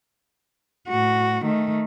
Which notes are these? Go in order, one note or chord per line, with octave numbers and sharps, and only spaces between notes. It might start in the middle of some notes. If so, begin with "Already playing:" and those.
A2 F#4
D#3 A3